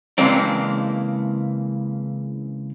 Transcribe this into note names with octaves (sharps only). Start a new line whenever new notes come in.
C#3 E3 G#3 A#3 C4 D4